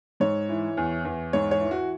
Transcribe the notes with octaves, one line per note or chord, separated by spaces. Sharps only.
G#2 C#5
E3
E2
E2
G#2 C#5
C#5
E3
F#4